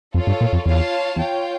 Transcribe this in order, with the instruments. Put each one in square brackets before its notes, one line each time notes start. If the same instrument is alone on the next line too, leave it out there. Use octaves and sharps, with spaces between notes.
[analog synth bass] F2 [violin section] F4 A4 C#5
[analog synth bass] G2
A#2
F2
[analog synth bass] E2 [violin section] F4 C#5 F5 A5
[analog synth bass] E2 [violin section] F4 C#5 G5